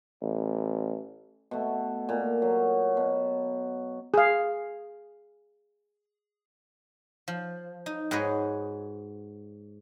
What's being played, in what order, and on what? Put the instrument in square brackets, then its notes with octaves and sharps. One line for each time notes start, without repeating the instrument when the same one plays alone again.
[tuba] A1
[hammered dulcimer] B2 A3
A#2
F#3
B2
[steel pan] G#4 F5
[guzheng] F3
D#4
G#2 F#4 G#4 B4 C#5 D#5